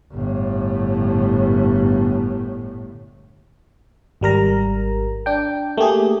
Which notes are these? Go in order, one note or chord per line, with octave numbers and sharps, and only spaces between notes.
G1 A2
G#1 G3 A#4 A#5
D4 G5
A3 A#3 G4 G#4